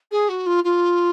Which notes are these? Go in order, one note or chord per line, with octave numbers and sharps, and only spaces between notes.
G#4
F#4
F4
F4